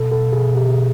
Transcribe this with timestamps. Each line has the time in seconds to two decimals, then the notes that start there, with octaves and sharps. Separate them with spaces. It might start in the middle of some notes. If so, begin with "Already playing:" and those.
Already playing: B2 A4
0.11 A4
0.32 G#4
0.55 G4
0.68 G#4